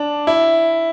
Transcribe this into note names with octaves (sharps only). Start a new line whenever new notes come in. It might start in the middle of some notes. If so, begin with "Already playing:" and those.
Already playing: D4
E4